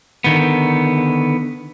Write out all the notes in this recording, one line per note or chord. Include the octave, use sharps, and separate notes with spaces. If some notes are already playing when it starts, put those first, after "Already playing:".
D3 D#3 B3